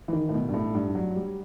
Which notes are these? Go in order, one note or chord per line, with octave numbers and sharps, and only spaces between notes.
E3
D#3
A2
B2
G2
A2
G2
F#3
G3